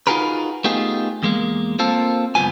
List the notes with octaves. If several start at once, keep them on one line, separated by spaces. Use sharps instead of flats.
D#4 F4 F#4 G#4 A#4 B4
A3 B3 D#4 F4 G4 G#4
E2 G#3 A#3
A#3 C4 F4 A4
C#2 F#2 E3 B3 F4 G#5